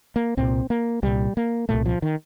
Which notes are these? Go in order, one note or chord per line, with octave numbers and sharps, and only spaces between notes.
A#3
C2 A#2 C4
A#3
C2 A#2 G3
A#3
C2 A#2 A3
F3
D#3